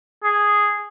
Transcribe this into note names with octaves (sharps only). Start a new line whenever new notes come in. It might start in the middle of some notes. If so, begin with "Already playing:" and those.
G#4